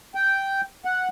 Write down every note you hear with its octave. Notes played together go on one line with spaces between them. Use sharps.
G5
F#5